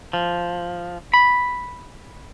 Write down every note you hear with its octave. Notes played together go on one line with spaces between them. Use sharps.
F3
B5